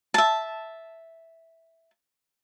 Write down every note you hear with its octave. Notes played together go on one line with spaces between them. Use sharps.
E5 A5